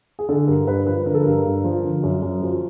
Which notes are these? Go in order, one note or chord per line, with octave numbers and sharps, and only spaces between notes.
G#4
D3 A4
G2 A#4
G2 B4
F3 B4
D3 A#4
A4
G2 A#4
G2
F3
D3
F#2
F#2
F3